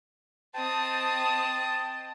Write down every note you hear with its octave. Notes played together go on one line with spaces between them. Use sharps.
C4 D#5 G5 A5 D#6